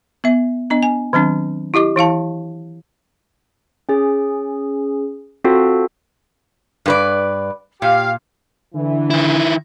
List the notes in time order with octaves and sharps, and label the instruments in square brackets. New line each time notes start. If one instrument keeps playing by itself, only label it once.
[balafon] B3 E5
B3 D4 D#5
G#5
D#3 F#3 C4 D4
E4 G4 D#5 D6
E3 E4 F5 A5
[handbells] C#4 G#4
C4 F4 F#4 A4
[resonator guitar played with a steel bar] G2 B4 D5
[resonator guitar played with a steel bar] A#2 [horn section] G4 F5
[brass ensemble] D3 E3
[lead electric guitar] D#3 E4